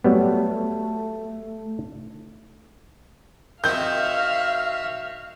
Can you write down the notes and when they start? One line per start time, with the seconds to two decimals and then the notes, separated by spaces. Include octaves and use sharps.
0.04 F#3 G3 A3 B3
3.64 D#3 C4 F#4 E5 F5 G6